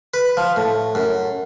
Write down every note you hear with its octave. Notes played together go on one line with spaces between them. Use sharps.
B4
F3
A2
F#2